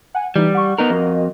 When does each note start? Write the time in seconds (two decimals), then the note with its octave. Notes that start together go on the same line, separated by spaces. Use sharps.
0.15 F#5 G#5
0.36 E3 G3 D#4
0.55 F#5 C#6
0.78 B3 D#4 A#4
0.90 F2 F#4 A#4 D#5